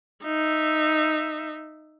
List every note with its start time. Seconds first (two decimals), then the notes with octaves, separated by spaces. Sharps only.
0.24 D#4 E5